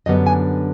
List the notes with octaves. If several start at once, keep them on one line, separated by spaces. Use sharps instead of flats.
F#2 D3 G3 B3 D#5
G#5